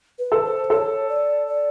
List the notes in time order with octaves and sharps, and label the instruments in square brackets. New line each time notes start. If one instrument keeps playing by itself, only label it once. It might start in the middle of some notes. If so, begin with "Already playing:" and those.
[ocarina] B4
[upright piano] A4
[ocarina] C5
[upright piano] A4 [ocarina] C#5
[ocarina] D5
D5